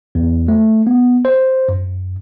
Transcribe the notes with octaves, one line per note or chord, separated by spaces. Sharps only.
E2
A3
B3
C5
F#2